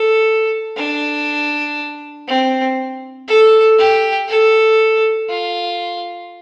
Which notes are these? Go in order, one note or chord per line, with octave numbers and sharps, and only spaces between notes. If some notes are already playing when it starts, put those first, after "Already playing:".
Already playing: A4
D4
C4
A4
G4
A4
F4